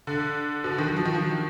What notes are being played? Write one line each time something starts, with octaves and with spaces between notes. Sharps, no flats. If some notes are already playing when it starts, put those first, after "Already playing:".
D3
B2
D3
D#3
F#3
F3
D#3
F3